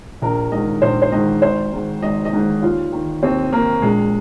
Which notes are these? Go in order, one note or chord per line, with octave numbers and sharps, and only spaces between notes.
A#1 A#4
G#2 D#3 D#5
A#1 C5
C5
G#2 D#3 D#5
G#1 C5
G#2 D#3
G#1 D#5
D#5
G#2 D#3
D#2 F4
D#3
D#2 C4
D#3 A#3
A#1 G#3